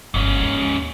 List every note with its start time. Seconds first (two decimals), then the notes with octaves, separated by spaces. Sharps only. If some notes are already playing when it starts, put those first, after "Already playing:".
0.14 G1 G#2 C#4
0.41 D#2